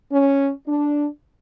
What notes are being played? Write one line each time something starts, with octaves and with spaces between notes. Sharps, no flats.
C#4
D4